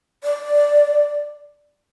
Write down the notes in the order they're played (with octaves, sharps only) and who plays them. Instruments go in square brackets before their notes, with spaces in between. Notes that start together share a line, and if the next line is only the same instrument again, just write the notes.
[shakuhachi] D5